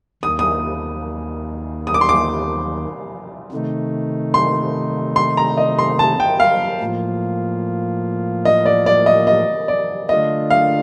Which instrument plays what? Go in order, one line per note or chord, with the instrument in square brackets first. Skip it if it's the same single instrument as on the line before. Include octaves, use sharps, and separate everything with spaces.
[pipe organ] D#2 D#3 A#3 [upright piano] D#6
[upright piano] D#6
D#6
D6
C6
D6
[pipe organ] C3 D#3 A3 D#4
[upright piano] C6
C6
A#5
D#5
C6
A5
G5
F5
[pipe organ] A2 F3 A#3 F4
[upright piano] D#5
D5
D5
D#5
D#5
D5
[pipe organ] D3 A3 D4 F4 [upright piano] D#5
[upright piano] F5